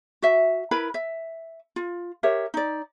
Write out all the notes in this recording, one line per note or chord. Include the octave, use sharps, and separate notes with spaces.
F#4 E5
E4 A#4 B4 B5
E5
F4
G4 A#4 C#5 E5
D#4 D5